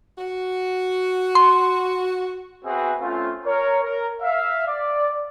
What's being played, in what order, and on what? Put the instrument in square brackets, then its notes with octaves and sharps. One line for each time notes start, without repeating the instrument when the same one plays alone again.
[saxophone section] F#4
[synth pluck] C6
[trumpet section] B3 C4 F#4 G#4 B4 E5
A3 C4 C#4 F4
A#4 C#5
A#4
E5 F5
D5